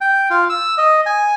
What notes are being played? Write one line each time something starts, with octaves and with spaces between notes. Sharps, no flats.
G5
F4
E6
D#5
G#5